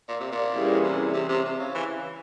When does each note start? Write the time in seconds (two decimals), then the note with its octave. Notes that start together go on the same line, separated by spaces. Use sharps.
0.09 A#2
0.20 C3
0.32 A#2
0.53 E3 G3 C#4 E4 G#4
0.84 C3
1.14 C3
1.29 C3
1.45 C3
1.59 C#3
1.75 E3